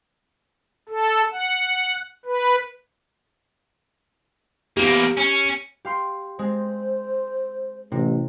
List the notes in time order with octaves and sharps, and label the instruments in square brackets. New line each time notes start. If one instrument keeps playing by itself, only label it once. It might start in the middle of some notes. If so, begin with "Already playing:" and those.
[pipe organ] A4
F#5
B4
[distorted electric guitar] E2 A#3 [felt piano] G4
[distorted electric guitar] C#4
[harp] G4 F5 C6
[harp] G#3 C4 [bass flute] C5
[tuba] A1 [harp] C3